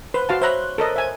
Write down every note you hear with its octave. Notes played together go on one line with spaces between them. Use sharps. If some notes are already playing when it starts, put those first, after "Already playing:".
B4 C5
F#4 F5 A5
C5 C#5 E5 A#5 B5 F#6
A4 A#4 D#5
E5 G#5